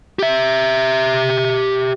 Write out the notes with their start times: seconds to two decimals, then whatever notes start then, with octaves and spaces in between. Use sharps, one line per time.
0.19 G4 E5